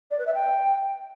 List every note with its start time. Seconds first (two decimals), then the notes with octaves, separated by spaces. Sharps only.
0.11 D5
0.18 B4
0.26 E5
0.34 G5